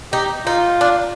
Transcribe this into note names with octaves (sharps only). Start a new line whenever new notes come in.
D#4 G4
D#4 F4
D4